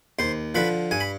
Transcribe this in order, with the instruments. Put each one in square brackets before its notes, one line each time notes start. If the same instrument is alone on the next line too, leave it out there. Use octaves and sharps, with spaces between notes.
[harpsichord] D#2 C5 C6
D3 F3 B4 B5
G2 G#5
B5